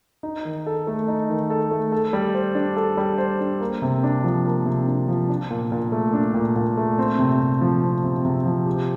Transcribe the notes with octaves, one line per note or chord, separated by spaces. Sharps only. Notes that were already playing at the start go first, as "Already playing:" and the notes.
D#4
D#3
A4
A3
D#4
D#3
A4
A3
A4
G3
C5
D4
A4
G3
C5
D4
A#3
C3
D4
F3
A#3
C3
D4
F3
D4
A#2
A#2
A3
D4
A#2
A#2
A3
C4
C3
C3
F3
C4
C3
C3
F3
G4